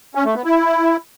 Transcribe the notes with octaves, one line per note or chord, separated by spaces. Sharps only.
C#4
A3
B3
E4